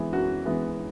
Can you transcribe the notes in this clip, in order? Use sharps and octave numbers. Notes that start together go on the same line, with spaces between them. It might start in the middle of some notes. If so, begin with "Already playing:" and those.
Already playing: E3 G#3 B3
F#2 F#4
E3 G#3 B3